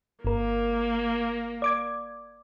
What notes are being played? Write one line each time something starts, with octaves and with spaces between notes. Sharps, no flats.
G1 A#3 A#4
D5 D6 G#6